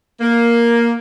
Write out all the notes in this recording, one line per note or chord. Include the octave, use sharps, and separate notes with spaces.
A#3